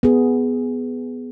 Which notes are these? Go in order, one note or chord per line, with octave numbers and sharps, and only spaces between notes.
B3 G#4